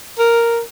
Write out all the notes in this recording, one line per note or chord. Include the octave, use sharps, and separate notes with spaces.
A#4